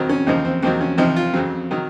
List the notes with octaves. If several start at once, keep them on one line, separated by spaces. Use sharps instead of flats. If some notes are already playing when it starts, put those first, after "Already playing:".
Already playing: F2 D#3 F#3 C4
C#4
D#2 C#3 F3 D#4
C4
D#2 D#3 F#3 C4
C#4
C2 C3 F3 D#4
F4
F2 C#3 F#3 C4
D#3 F#3